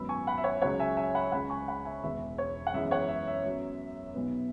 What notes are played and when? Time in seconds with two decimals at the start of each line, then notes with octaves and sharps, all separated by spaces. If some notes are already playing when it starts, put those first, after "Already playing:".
Already playing: G#1 F#2 F#3 B3 B5 E6
0.09 G#5 C#6
0.27 F#5 B5
0.38 E5
0.44 C#5 F#5
0.62 C#2 C#3 F#3 C#5 F#5
0.80 E5 G#5
0.97 E5 G#5
1.15 F#5 B5
1.32 C#2 C#3 G#3 F#5 B5
1.50 G#5 C#6
1.68 F#5 B5
1.85 E5 G#5
2.03 E1 E2 E3 B3 E5
2.38 C#5
2.67 F#5
2.74 F#2 E3 G#3 B3 E5
2.91 C#5 F#5
3.09 E5
3.27 E5
3.45 F#2 F#3 B3
4.14 B1 B2 B3